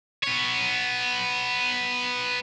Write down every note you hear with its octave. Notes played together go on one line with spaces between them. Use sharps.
B3 C#5